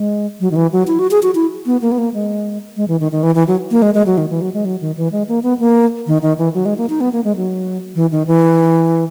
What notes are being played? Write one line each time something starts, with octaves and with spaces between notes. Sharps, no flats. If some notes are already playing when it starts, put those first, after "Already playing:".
Already playing: G#3
F#3
D#3
E3
F#3
E4
F#4
G#4
F#4
E4
B3
A#3
B3
A#3
G#3
G#3
E3
D#3
D#3
E3
E3
F#3
A#3
G#3
G#3
F#3
D#3
E3
F#3
G#3
F#3
D#3
E3
G#3
A#3
B3
A#3
D#3
D#3
E3
F#3
G#3
A#3
D#4
B3
A#3
G#3
F#3
E3
D#3
E3